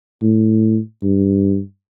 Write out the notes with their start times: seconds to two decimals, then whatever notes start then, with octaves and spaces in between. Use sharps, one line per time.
0.22 A2
1.03 G2